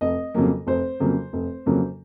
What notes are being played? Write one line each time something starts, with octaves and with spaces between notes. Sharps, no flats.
F1 D#5
F2 C#3 F#3 A#3
F1 C5
F2 C#3 F#3 A#3
F1
F2 C#3 F#3 A#3